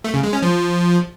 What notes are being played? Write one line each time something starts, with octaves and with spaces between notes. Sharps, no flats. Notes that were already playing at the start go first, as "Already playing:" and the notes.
A3
C#3
G#3
C#4
F3